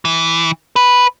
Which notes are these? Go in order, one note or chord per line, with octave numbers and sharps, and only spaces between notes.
E3
B4